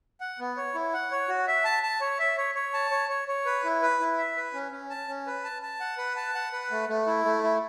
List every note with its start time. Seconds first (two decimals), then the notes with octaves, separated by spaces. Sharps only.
0.21 F#5
0.39 B3
0.57 C#5
0.75 E4
0.93 F#5
1.11 C#5
1.28 F#4
1.48 E5
1.65 A5
1.83 A5
2.01 C#5
2.19 E5
2.37 C#5
2.55 C#5
2.74 A5
2.91 C#5
3.09 C#5
3.28 C#5
3.45 B4
3.64 E4
3.82 B4
4.00 E4
4.18 E5
4.36 B4
4.54 C#4
4.72 C#4
4.90 A5
5.08 C#4
5.27 B4
5.44 A5
5.62 A5
5.80 F#5
5.98 B4
6.16 A5
6.35 F#5
6.53 B4
6.71 A3
6.88 A3
7.07 E4
7.25 A3
7.43 E4